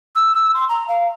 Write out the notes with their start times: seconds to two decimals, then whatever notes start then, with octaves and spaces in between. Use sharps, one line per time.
0.15 E6
0.35 E6
0.54 C6
0.69 A#5
0.88 F5